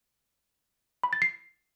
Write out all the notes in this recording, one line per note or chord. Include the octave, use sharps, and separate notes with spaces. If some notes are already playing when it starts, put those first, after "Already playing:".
B5
A6
C7